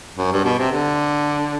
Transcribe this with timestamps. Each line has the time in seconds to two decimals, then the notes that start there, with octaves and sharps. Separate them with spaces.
0.18 F#2
0.32 G2
0.44 B2
0.58 C3
0.72 D3